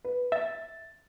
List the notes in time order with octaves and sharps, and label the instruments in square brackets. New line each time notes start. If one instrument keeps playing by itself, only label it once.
[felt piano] B4
[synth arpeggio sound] E5 [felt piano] A6